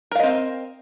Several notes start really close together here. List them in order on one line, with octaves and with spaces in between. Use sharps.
A#4 F5 D#5 C4